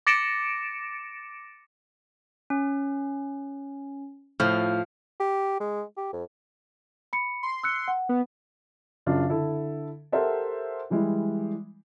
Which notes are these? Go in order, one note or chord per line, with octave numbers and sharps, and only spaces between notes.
D6 A6 A#6 C#7 D7 E7
C#4
A2 F3 F6
G4
G#3
G4
F2
B5 C#7
C6
E6 F#6 C#7
F#5
B3
F#2 C#3 D4 F4
D3 E4 A4
G4 A4 A#4 C5 E5 F#5
E3 G3 G#3 E4